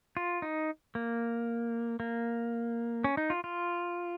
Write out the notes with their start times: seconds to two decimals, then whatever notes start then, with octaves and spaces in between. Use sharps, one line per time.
0.17 F4
0.42 D#4
0.95 A#3
2.00 A#3
3.04 C#4
3.17 D#4
3.30 F4
3.44 F4